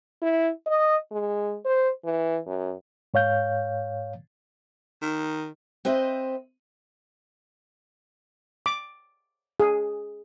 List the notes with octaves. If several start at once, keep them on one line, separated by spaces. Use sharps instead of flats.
E4
D#5
G#3
C5
E3
F#2
G#2 C#5 F5 G6
D#3
C4 B4 C5 D#5 E5
D6
G#4